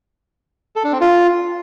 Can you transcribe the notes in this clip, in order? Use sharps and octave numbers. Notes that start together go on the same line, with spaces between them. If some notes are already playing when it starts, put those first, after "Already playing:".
A4
D4
C4
F4